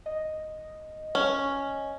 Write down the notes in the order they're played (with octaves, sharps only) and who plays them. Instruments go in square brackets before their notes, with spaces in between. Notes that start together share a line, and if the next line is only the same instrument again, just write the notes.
[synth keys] D#5
[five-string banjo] C#4